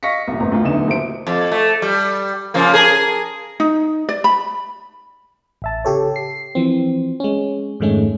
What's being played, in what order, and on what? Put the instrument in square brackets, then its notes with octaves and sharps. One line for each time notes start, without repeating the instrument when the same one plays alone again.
[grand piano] D#5 F5 C#6 A#6 B6 C#7
C2 F2 A#2
G1 A2 C4 A#5
D2 A2 F4
D1 E2 D3 A3 D#4 E7
D#1 D#2 E4 C5 D7
[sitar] F2
A3
G3
C#3 F3 A#3
G#4 A#4
[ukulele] D#4
D5
B5
[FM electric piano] A1 E5 A5
C#3 G4 A4 C#5
C7
E3 F3 C4
G#3 C#4
F2 G#2 D#3 G#3 A3 C#4